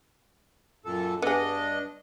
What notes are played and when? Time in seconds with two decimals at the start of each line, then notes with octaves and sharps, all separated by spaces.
0.85 F#2 A#2 A4
1.22 G2 B3 D4 G#4 D#5